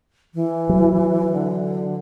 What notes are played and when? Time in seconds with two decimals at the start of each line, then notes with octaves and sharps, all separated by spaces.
0.34 E3
0.69 F#3
1.33 D3